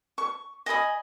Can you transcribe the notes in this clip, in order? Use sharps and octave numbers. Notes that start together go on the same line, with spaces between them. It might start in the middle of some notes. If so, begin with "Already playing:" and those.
C#6
D#5 G#5 B5 D#6